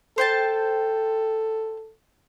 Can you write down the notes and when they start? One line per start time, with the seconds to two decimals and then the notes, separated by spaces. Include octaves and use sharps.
0.18 A4 C5 G5 A5